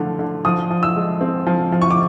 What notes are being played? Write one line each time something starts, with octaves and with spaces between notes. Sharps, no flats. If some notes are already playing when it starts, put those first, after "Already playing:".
Already playing: D3 F3 A3
D3
F3 D#6
F3
E6
G#3
C4
F3
F3
C#6
D6